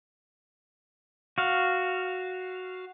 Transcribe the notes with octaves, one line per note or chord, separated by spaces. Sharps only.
F#4 F5